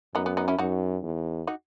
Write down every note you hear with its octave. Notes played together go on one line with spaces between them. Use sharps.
F#2 B3 D#4
B3
B3 D#4
C#4 E4
F#2 D#4 F#4
E2
D#4 F#4